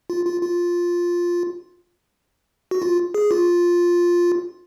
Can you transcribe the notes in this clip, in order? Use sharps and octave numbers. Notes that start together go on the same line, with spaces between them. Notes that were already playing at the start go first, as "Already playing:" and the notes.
F4
F4
F4
F#4
F4
G#4
F4